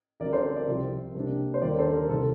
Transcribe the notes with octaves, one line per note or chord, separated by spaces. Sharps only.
D2 D3 G3 C4 A#4 D5
A4 C5
A#4 D5
C2 C3 F3 C4
C3 G3 A#3 D4
C5
D#2 D3 G3 A#4 D5
A4 C5
A#4
C2 C3 D#3 A4